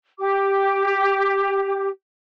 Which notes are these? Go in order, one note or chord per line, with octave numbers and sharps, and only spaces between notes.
G4 D6